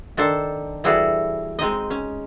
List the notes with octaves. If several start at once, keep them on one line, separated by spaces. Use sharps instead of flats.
D#3 D4 A4 C5
E3 G3 E4 F#4 G#4 A4
G#3 C4 D#4 D#5
C#4